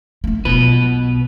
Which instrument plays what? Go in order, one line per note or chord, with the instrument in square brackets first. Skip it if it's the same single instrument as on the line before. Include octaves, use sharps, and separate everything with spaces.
[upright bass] A3 A#3
[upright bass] B1 F4 [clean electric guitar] B2 B4